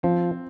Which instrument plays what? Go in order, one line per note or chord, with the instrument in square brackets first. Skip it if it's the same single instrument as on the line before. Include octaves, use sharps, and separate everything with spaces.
[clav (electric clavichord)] F3 [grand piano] C4